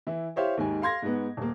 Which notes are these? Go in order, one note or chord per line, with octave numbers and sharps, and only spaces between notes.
E3 E4
E4 G4 C5 C#5 E5 F5
D#2 G#2 G#5
F5 C6 G#6 A#6
G#2 G#3 B3
D#1 A#3